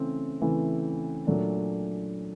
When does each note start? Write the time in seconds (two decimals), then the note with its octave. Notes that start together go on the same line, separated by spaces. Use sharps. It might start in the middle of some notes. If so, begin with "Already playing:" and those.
Already playing: C#3 E3 A3 C4
0.41 C#3 E3 A3 C4
1.27 A#2 F#3 A3 D4